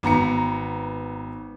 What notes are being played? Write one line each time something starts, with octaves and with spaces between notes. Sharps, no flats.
G#1 B3 A#5 C#7